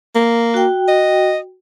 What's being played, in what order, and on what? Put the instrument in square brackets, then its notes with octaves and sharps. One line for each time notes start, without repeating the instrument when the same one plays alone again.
[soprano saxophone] A#3
[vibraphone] F#4 G5
[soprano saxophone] D#5